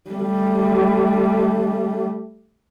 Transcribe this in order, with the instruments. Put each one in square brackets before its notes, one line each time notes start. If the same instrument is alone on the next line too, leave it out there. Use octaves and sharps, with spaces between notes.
[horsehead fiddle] G3 A3